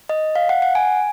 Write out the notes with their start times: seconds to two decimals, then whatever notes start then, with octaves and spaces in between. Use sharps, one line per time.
0.09 D#5
0.35 F5
0.49 F#5
0.62 F#5
0.75 G#5